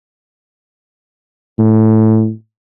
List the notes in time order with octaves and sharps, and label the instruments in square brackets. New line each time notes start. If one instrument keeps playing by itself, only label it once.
[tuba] A2